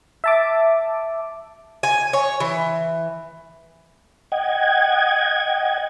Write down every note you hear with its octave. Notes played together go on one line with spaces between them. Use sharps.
E5 A5 D6
G#5
C#5
E3
D#5 F#5 G5 G#6